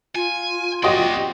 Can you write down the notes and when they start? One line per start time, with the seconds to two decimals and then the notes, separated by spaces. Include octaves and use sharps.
0.15 F4 G#5
0.83 A#1 C4 F#4 G4 D5 D#5 C6